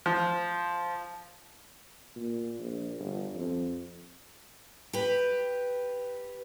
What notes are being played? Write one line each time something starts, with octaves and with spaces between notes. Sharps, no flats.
F3
A#2
A#1
G1
F2
G4 B4